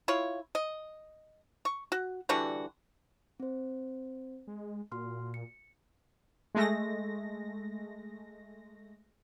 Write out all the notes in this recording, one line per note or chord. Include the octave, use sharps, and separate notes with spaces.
E4 F4 C#5
D#5
C#6
F#4
D3 E3 G3 F#4
C4 C5
G#3
A#2 F#4 C6 F6
C#7
G#3 A3 A#6